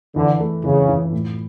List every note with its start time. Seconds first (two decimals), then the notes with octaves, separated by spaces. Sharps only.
0.15 D3 E3
0.40 A3
0.64 C#3 E3
0.89 E3
1.12 A2